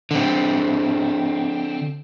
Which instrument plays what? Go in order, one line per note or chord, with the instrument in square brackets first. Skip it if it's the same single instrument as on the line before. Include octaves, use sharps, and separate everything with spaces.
[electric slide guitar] D3 C4